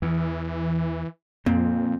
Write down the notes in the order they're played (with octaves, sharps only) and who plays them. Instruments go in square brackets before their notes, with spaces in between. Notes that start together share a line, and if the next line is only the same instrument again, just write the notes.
[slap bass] E2 [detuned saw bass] E3
[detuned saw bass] F2 [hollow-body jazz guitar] A#2 [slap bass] C4